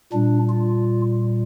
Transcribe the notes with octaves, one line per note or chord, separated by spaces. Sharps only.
A#2 G3 D4
F4